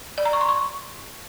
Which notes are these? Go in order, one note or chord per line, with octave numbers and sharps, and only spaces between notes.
D5
A#5
C#6
C6
C#6